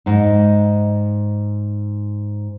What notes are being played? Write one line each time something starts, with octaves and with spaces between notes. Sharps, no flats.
G#2 D#4